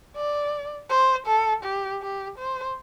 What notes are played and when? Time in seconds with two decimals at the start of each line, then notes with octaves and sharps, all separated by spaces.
0.16 D5
0.90 C5
1.27 A4
1.64 G4
2.02 G4
2.38 C5